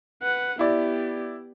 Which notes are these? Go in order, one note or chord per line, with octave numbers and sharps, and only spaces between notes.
B4 F#5
B3 E4 G4 D5